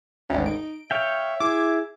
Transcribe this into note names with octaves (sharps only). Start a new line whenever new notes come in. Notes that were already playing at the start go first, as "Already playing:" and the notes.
G#1 D2 C#4
D#4 D7
C#5 E5 F5 G5
E4 G#4 D6